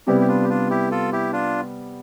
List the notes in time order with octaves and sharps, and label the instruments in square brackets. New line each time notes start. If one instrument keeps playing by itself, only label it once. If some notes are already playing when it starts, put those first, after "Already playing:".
[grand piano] C3 G3 B3 [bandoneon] E4 G4
[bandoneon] G4
D4 F4
G4
D4 F4
E4 G4
F4 A4
E4 G4
D4 F4